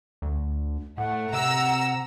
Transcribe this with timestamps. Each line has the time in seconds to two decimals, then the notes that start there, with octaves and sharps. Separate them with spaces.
0.22 D2
0.98 A2 A3 F#5
1.33 C3 A#5 E6